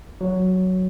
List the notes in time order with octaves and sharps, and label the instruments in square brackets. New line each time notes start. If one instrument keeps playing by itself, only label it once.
[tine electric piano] F#3